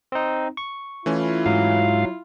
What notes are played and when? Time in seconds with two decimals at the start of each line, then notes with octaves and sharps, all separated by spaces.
0.12 C4 D#4
0.57 C#6
1.06 E3 A3 C#4 E4 F4
1.46 G#2 F#3 F5